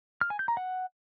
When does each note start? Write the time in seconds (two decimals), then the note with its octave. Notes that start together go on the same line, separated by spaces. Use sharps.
0.21 F6
0.30 G#5
0.39 G6
0.48 A#5
0.57 F#5